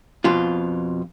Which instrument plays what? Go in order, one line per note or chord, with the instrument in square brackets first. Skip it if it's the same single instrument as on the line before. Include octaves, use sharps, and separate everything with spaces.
[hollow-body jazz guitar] F2 B2 F4